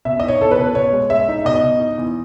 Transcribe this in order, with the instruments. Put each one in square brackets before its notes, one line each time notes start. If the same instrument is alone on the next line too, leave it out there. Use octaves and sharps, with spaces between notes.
[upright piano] B2 E5
D#4 D#5
C#5
E2 A4
B4
B2
B2 C#5
G#3
G#3 E5
D#4
B2 D#5
B2
D#4
E2